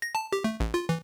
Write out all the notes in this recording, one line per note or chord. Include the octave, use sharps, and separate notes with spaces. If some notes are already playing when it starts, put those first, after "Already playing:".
A#6
A5
G4
A3
A1
F4
E3